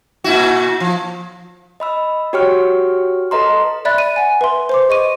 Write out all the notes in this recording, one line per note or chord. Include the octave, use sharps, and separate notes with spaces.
A#2 E4 F#4
F3
D#5 B5 E6
F#4 G4 C#5 G5 C#6 F6
A4 B4 D#5 A#5 C6
D5 E5 B5 F#6 A6
D#7
F#5 G#5
B4 E5 C6
C5 C6 D6
G#4 D#5 C#6 D#7